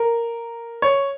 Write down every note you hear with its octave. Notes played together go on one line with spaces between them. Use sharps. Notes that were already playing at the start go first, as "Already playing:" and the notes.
Already playing: A#4
C#5